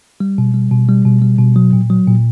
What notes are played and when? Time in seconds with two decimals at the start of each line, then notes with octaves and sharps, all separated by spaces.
0.20 G3
0.38 B2
0.54 G3
0.71 B2
0.89 G3
1.05 B2
1.22 G3
1.39 B2
1.56 F#3
1.73 A#2
1.90 F#3
2.07 A#2